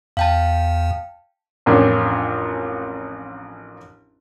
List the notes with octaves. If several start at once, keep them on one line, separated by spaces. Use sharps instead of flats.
E2 F5 G5 A5
A1 F2 C#4 D4 A#4